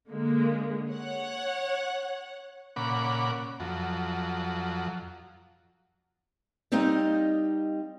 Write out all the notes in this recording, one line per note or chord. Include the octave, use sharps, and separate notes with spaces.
D3 G#3 A#3
C#5 F#5
A#2 C#3 F#5 B5 D6
F2 F#3
G3 C4 D#4 D#5 F5